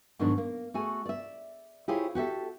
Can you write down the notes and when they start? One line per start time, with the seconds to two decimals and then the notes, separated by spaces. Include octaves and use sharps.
0.19 G#2 B2 D#3 F#3 D4
0.38 A#3
0.74 A3 F#4 G#4 G#5
1.06 D5 E5
1.88 E4 F4 G4 G#4 C5 C#5
2.15 F#4 G4 A4 E5